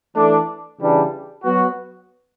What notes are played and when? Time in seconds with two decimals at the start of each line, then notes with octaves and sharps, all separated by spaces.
0.14 E3 A3 D4 A4
0.79 C#3 E3 G3 D4
1.43 F#3 B3 F#4